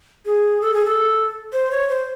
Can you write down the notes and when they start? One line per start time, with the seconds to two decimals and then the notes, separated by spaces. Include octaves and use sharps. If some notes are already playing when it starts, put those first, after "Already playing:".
0.25 G#4
0.61 A4
0.73 G#4
0.85 A4
1.53 C5
1.71 C#5
1.89 C5